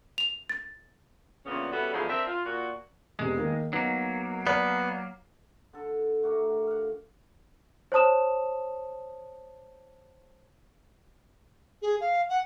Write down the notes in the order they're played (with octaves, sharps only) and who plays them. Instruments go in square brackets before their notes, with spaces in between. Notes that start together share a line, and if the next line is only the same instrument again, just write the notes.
[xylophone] F7
A6
[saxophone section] G2 A#2 C#3 E3 B3 C#4
G3 B3 C#4 E4 F#4 A4
G#2 B2 D3 E3 F3 G#4
C4 D4 A#4 E5
F4
A#2 F#4
[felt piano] E1 C3 [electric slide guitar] G#3
[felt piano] D#3 A#3
[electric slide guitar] F#3 A#3 [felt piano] B3 D#4
[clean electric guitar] B3 [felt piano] D5 F6
[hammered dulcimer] D3 A4
A3 F#4 G4 A#4
F5 F#5
[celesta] C5 C#5 A5 D#6 E7
[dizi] G#4
F5
F#5